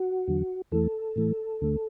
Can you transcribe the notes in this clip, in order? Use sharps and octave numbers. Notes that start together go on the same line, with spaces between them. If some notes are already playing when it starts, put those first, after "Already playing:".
Already playing: F#4
E2 D3 F#3
E2 E3 A3 A4
A2 E3 A3
D2 D3 A3